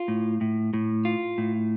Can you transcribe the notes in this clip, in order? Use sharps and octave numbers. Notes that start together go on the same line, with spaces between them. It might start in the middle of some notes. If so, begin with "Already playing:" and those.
Already playing: F4
A2
A2
A2
F4
A2